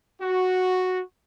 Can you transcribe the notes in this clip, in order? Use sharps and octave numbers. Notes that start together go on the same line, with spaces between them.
F#4